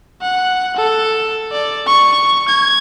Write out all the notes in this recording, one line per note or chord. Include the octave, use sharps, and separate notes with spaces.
F#5
A4
D5
C#6
G#6